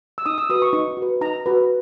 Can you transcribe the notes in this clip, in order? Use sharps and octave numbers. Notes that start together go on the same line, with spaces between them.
E6
D#4 D#6
E6
F#4 B4 D#6
C#6
D#4 C#6
F#4 B4
D#4 A#5
F#4 B4